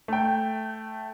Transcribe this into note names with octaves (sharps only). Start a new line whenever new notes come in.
A3 G5